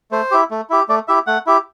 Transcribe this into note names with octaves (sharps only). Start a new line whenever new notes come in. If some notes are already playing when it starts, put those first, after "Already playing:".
A3 C5
E4 G4
A3
E4 G4
A3 D5
E4 G4 E5
A3 F#5
E4 G4